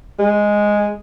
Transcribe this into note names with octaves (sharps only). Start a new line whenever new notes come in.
G#3